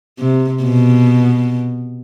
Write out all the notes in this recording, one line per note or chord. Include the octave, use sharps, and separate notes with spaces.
C3
B2